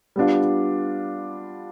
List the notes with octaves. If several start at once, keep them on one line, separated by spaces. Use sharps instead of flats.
G3 B3 D4 F4